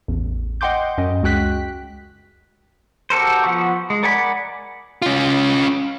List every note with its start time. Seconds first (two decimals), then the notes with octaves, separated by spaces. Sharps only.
0.08 A1 E2
0.61 D#5 F#5 G5 C6 D6 G6
0.98 F#2 C#4 D#5
1.23 C#2 G#3 F#4 G5 F#6 B6
3.10 F#4 G4 A4 A#4 C5
3.44 F3 B3 F#5 C#6
3.90 G#3
4.03 A#4 D5 F#5 G#5 B5
5.02 C#4 F4